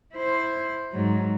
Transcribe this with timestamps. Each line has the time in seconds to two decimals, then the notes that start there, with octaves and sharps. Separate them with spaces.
0.14 E4 C5
0.92 G#2 F#3